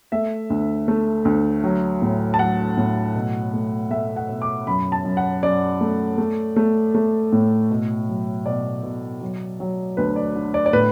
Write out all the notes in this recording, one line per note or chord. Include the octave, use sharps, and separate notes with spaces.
A3 E5
D2
A3
D2
F#3
A2
A5
F#3 F#5
A2
B2
A3
A3 E5
F#5
B2
D6
F#2 B5
A5
F#2
F#5
F#2 D5
A3
A3
A3
A3
A2
B2
F#3
B2 D5
B2
F#3
F#3
D2 B4
D5
D3
D5
D5
A2 B4